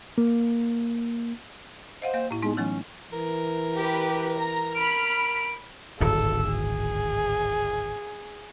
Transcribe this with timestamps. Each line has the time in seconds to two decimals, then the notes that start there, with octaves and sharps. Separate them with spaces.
0.18 A#3
2.02 C5 D#5 F5 F#5
2.14 A#3 F5 G6
2.31 A2 E4
2.42 G#3 B3 D#4
2.57 E3 F#3 A3 C#4
3.12 E3 A#4
3.76 G4 B4
4.37 A#5
4.75 B5 F6 D7
6.00 D1 G#1 G2 A4 E6
6.47 G#4